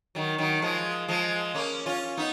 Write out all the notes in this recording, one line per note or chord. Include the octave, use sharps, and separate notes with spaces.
D#3 F#3
D#3 F#3
F3 G#3
F3 G#3
A#3 C#4
C#4 F4
B3 D#4